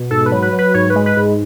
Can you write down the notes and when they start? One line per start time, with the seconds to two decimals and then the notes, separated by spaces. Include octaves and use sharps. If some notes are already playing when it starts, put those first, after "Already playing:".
Already playing: B2
0.11 G#2 A4
0.26 B4
0.32 F#3
0.42 B4
0.53 F#3
0.59 B4
0.74 G#2 C#5
0.90 B4
0.96 G#3
1.06 B4
1.17 G#2